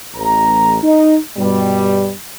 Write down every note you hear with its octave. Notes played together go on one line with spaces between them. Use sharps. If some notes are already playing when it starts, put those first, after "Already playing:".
A1 A#5
D#4
G2 B2 G3